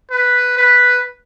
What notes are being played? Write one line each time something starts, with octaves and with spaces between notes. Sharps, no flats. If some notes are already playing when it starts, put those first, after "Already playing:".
B4
B4